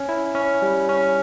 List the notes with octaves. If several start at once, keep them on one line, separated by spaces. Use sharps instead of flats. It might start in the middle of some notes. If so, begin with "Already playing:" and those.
Already playing: C#4
E4
C#4
G3
C#4